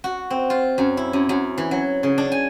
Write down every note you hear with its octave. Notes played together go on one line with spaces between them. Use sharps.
F#4
C4
F4
F#2
E4
F#2
F#2
E3
F#3
C#3
D4
G#5